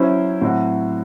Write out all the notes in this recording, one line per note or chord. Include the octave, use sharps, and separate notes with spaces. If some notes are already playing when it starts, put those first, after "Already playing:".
Already playing: F#3 C#4 E4 C5
A2 F#3 C4 F#4